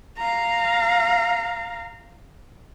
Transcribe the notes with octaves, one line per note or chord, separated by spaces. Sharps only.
F5 A#5